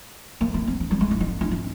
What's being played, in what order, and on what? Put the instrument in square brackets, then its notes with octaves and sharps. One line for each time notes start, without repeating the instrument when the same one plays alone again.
[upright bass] A#3
B3
C4
C4
G3
G#3
D4
D#4
D4
C#4